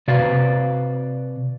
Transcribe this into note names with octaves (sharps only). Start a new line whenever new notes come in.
C3 F#4 B4 D5 F5